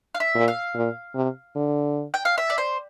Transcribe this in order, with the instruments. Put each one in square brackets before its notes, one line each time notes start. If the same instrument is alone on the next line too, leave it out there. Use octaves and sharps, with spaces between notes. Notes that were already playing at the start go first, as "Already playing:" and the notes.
[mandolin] F5
E5
[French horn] A#2
[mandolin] F5
[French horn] A#2
C3
D3
[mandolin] G5
F5
E5
D5
C5